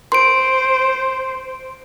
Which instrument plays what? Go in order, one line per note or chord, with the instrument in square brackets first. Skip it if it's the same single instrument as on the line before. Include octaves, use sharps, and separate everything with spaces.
[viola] C5 [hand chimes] C6 D7